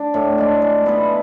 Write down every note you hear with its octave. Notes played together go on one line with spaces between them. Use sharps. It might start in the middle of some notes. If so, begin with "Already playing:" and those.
Already playing: D4
A2
G#3 D4
G#3
B3 E4 B4